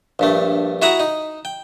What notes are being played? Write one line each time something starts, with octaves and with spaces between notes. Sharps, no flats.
A#1 G2 A3
E4 F#4 G#4 E5 F#5 A#5
D#4
G5